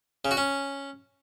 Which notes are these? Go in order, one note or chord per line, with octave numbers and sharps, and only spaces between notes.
C#3
F#4
C#4